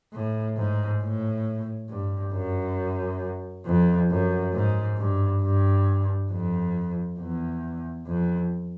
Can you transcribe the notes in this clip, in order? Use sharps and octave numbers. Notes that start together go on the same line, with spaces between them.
A2
G#2
A2
G2
F#2
F2
F#2
G#2
G2
G2
F2
E2
F2